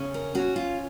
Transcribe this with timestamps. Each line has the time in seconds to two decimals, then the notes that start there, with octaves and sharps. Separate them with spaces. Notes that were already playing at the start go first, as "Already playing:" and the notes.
Already playing: C#3 C#4
0.14 A#4
0.35 C#4 F#4
0.56 F4